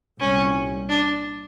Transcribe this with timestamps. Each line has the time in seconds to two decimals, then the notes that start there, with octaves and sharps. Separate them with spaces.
0.20 C2 A#2 G3 C#4
0.89 D4